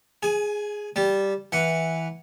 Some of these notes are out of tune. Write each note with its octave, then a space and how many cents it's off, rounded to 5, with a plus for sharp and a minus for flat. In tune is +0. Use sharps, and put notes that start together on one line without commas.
G#4 +0 G#5 +30
G3 +0 A5 -20
E3 -10 F#5 +0